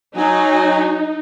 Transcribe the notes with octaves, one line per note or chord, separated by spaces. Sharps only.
F#3 D#4 G#5